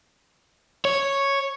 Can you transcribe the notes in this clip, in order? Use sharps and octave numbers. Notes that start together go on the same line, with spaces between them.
C#5